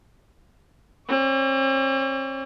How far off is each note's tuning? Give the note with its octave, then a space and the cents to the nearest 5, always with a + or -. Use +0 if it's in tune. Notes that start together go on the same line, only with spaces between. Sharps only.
C4 +45 C#5 +45